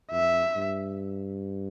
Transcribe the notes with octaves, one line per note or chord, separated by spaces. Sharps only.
F2 E5
G2